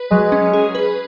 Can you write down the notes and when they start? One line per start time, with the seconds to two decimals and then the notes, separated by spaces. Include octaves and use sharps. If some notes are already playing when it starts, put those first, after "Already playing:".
Already playing: B4
0.11 F#3 G#3
0.32 C#4
0.53 G#4
0.75 B4